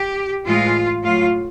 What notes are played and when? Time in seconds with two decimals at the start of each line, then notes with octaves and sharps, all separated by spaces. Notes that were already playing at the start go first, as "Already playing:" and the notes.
Already playing: G4
0.46 A2 E3 G#3 F4
1.03 A2 F#3 F4